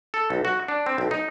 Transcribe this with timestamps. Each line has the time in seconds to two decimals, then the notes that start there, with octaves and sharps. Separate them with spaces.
0.14 A4
0.30 B1
0.45 F#4
0.68 D4
0.86 C4
0.98 B1
1.11 D#4